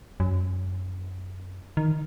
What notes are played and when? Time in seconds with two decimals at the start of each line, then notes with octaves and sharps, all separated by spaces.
0.20 F#2
1.77 D#3